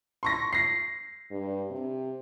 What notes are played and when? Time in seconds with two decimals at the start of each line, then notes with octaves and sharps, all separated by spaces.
0.23 C6 C#6 A#6
0.53 A#6 C7
1.31 G2
1.70 C3